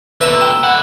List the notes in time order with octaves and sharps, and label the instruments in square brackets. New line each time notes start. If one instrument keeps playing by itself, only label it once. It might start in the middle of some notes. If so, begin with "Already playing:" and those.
[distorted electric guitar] B2 D3 [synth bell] B4 E7 [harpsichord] E5 A#5
[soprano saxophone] G5 [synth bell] E7
[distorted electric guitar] D3 E4 [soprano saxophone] F#5